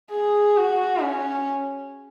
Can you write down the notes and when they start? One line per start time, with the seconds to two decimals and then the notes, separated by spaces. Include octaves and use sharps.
0.11 G#4
0.57 F#4
1.02 C#4